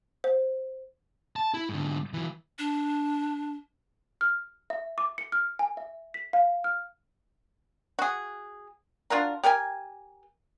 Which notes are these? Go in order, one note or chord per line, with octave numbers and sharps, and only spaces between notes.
C5
A5
E4
G#2 D3
E3 F#3
D4
F6
E5
D6
C#7
F6
G#5
E5
B6
F5
F6
F#4 G#4
D4 F4 F#4 A#4
G4 A#4 G5 G#5